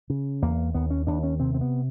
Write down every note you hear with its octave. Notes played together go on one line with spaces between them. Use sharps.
C#3
E2 A#3
D#2 B3
C#4
D#2 D4
C#4
C3 C4
C4
B3